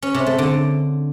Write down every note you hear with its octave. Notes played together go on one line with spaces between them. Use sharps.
C#4
C3
A3
D3